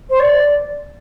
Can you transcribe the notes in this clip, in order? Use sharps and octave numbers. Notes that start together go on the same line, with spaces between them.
C5
D5